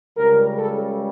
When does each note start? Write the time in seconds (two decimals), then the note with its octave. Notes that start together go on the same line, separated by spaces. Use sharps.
0.16 C#2 C#3 G3 A#4
0.56 A4